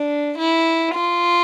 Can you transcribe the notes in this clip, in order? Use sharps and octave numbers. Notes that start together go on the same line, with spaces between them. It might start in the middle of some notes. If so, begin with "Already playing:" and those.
Already playing: D4
E4
F4